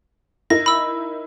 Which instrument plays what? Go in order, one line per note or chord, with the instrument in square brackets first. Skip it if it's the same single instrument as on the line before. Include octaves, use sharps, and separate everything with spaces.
[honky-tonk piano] D#4 E4 A#4 [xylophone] A#6
[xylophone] B5 E6